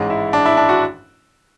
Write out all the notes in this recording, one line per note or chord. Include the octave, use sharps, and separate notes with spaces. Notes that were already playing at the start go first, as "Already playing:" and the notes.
Already playing: A1 G#2 G#3
E4
D4
E4
D4
F#4